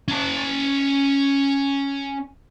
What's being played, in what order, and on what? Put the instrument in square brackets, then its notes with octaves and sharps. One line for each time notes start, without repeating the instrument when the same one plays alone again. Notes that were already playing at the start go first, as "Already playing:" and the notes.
[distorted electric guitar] C#4 A5